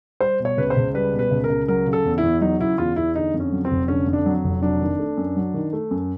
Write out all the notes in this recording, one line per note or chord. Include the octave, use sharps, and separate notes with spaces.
G3 C5
B2
C#5
C#2 B4
C5
C#2
G3 B4
B2
B4
C#2
A#4
C#2
F#3 A#4
C#3
A4
E2
E4
E2
F#3 D#4
C#3 E4
E2 F4
E2 E4
D3 D#4
F2
C#4
F#3
C4
F1
D3 C#4
F2
D4
F#3
F1
F#3 D4
D#3
A3
F#2
F#3
D#3
A3
F#2